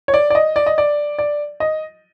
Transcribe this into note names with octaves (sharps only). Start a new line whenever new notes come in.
C#5
D5
D5
D#5
D5
D#5
D5
D5
D#5